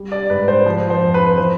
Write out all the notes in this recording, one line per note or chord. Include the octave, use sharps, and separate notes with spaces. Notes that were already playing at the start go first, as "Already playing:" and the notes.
Already playing: G3
D5
G#2 B4
C5
F3
C5
F2
B4
E3 C5